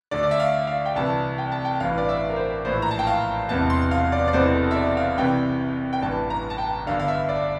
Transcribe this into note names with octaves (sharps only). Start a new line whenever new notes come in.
D2 D3 D5
D5
E5
F5
F5
G5
C2 C3 E3 A5
G5
A5
G5
A1 G2 E3 F5
D5
E5
A#4
C5
A#1 A2 E3 C5
A#5
A5
G5
F5
E1 E2 C3 E3 A5
C6
F5
D5
D5
E1 E2 C3 E3 C5
A4
E5
D5
F5
C2 C3 E3 G5
G5
A1 G2 E3 A5
A#5
A5
G5
G1 G2 D3 F5
F5
E5
D5